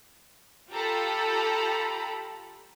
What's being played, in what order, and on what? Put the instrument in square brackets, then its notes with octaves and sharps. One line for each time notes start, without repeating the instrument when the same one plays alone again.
[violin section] F4 G4 A4 A#5 B5